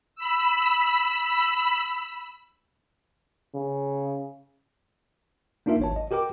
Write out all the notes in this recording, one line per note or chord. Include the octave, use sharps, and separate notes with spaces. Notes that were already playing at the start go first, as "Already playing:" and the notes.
B5 E6
C#3
A#3 D4 D#4 F4 A#4 E5
G#1 C#5 A5
D#5
F#4 G4 A#4 G5 D6